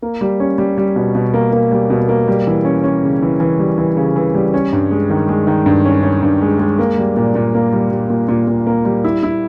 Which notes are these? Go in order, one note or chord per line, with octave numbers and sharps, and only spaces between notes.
A#3
G3
C#4
G3
G3
B2
B2
A#3
A#3
G3
B2
A#3
G3
E3
C#4
C#4
C#3
E3
E3
G3
E3
C#3
E3
G3
C#4
G2
G#3
D#3
G#3
D#3
G2
C#4
C#4
G2
G#3
G#3
A#3
G3
A#2
A#2
A#3
G3
G3
A#2
A#2
A#2
A#3
G3
E4
E4